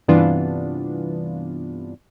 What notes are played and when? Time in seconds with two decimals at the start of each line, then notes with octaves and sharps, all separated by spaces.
0.08 G2 C3 E3 B3 D4 F4